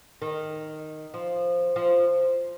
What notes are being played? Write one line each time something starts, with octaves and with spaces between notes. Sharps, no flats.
D#3
F3
F3